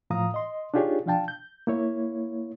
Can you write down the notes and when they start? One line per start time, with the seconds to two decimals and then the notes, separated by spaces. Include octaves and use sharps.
0.10 A2 F3 F5 A#5 D#6
0.34 D#5 C6
0.74 D4 D#4 F4 G4 G#4 C#5
1.06 F3 D4 F5 G5 A5
1.28 G6
1.67 A#3 E4 C#5